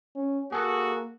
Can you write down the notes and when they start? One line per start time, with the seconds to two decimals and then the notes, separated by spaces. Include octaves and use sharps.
0.15 C#4
0.52 A#3 F#4 G#4 A4